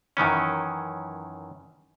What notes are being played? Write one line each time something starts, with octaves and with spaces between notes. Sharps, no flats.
F#2 D#3 E3 C#4